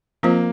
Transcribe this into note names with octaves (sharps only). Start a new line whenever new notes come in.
F3 A#3 C4 F4 C5